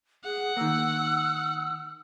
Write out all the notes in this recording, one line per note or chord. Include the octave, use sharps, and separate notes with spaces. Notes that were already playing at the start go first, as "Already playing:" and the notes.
G#4 F#5
D#3 A#3 E6